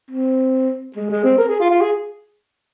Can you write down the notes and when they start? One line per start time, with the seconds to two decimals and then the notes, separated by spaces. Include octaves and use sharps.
0.10 C4
0.96 G#3
1.10 G#3
1.24 C4
1.38 A#4
1.49 G#4
1.60 F4
1.70 F4
1.81 G#4